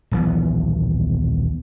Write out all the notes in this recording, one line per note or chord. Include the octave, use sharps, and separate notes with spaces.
D#1 B1 E3 B3